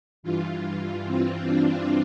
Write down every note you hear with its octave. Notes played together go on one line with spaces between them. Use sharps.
G2 E3 F4
C4
D4